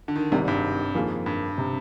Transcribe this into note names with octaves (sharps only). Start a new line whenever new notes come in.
D3
D#3
G#1 G#2 C3 G3
G2
F2 D#3 A#3 F4 G#4
G2
C3